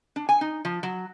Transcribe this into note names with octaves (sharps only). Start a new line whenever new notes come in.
D4
G#5
D#4
F3
F#3